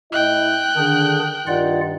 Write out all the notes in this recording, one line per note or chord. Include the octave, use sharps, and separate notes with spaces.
A2 E4 D#5 G5 F#6
D3 D#3 D4 G#4
G2 D#3 F4 D5 F#5